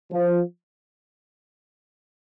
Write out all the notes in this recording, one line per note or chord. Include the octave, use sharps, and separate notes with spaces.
F3